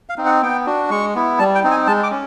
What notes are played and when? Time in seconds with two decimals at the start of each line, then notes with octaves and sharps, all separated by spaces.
0.09 F5
0.18 C4 D#4
0.26 F#5
0.42 B3 G5
0.66 D4 F#4
0.90 G#3 C#6
1.15 B3 E4
1.39 G3 A5
1.55 G5
1.64 C4 D#4
1.71 G#5
1.87 G#3 A5
2.03 D6
2.11 C#4